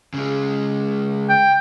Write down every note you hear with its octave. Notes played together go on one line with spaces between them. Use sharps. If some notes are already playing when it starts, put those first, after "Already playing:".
C#3 G#3
G5